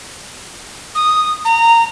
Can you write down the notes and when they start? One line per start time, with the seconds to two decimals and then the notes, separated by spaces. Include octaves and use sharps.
0.95 D#6
1.45 A#5